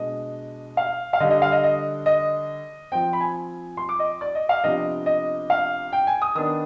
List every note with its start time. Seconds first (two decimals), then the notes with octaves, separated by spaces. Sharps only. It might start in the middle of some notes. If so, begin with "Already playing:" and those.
Already playing: B2 G#3 D4 D#5
0.77 F5
1.13 F5
1.20 D3 G3 D4 D#5
1.30 D#5
1.42 F5
1.52 D#5
1.64 D#5
2.06 D#5
2.92 F3 C4 G5
3.13 B5
3.20 G#5
3.77 C6
3.89 D6
3.99 D#5
4.21 D5
4.35 D#5
4.49 F5
4.64 C3 F3 B3 D4 D#5
5.06 D#5
5.50 F5
5.93 G5
6.07 G#5
6.22 D#6
6.35 D#3 B3 D4 D#6